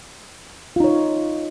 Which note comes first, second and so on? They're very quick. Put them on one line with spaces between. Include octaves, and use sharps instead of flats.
F4 D#4 C#5